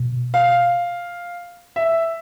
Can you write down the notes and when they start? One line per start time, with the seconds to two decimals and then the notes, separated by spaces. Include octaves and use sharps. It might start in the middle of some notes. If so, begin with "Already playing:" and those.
Already playing: B2
0.34 F5
1.76 E5